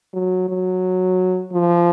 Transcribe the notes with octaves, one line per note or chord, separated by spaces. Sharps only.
F#3
F#3
F3